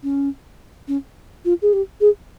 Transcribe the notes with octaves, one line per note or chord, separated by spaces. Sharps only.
C#4
C#4
F4
G#4
G4
G#4